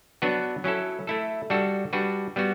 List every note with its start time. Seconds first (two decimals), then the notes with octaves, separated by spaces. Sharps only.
0.22 F#3 B3 D4 F#4 B4
0.64 F#3 C#4 E4 A4
1.07 A3 E4 A4
1.50 G3 D4 F#4 A4
1.93 G3 D4 F#4 B4
2.36 G3 B3 F#4